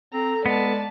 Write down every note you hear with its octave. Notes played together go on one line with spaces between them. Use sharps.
C4 A4 A#5
G#3 B3 D5 A5